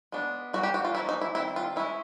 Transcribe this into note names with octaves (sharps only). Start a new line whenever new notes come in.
G#3 B3 D4
G3 A#3 C#4 F#4
G4
F#4
F4
F3 A#3 C#4 E4
D#4
E4
D#3 G3 C4 E4
F4
G#3 C#4 E4